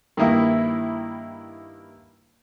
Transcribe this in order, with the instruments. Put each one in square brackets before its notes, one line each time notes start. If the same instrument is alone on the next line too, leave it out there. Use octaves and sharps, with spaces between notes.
[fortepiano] G2 D#3 A#3 E4